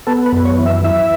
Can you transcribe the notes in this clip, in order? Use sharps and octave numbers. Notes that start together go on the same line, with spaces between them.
B3 A4
B4
F#2
C#5
E3
E5
E3 E5